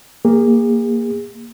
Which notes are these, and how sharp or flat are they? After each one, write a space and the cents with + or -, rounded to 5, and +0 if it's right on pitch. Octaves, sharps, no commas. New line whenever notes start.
A#3 +0 G#4 -40